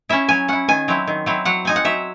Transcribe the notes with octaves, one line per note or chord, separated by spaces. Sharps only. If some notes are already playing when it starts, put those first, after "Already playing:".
C#4 E4 E5
F#3 G#5
C#4 E4 F#5
D#3 G#5
F#3 C4 E4
D#3
F#3 C4 E4
F#3 F#5
C4 D#4 G#5
F#5
F#3 E5